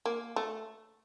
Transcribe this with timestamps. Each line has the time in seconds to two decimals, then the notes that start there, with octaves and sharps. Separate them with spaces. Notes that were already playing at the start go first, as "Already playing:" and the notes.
0.05 A#3
0.36 A3